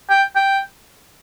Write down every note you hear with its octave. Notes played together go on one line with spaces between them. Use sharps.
G5
G5